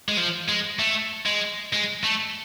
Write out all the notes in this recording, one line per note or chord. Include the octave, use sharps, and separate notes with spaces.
G#3
F3
G#3
A3
G#3
G#3
A3